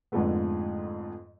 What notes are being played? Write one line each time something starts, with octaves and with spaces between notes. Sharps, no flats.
F2 G#2 D3 F3 A3 B3